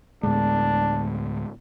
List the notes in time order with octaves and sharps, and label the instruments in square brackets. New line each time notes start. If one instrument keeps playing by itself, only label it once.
[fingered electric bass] D2 A2 B3 [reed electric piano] G#3 [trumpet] D4